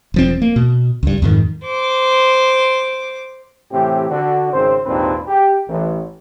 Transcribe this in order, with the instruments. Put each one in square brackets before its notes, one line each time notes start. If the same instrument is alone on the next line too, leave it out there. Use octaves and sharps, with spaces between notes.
[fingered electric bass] E1 F3 C4
A#3
B2
C#2 G2
F2 G#2 D#3
[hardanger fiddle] C5 D6
[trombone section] A2 C3 E3 C4 G4
D3 D4 F#4
G#1 C#3 C4 C5
G#1 D#2 A#2 C4 D4 B4
G4
A1